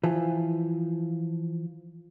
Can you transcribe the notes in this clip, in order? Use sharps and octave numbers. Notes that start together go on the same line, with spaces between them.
E3 F3